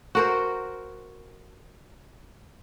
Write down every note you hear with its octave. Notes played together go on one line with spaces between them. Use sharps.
F#4 A#4 C5